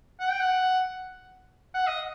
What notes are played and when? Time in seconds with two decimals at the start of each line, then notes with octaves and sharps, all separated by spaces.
0.20 F#5
0.30 G5
0.40 F#5
1.74 F#5
1.87 D#5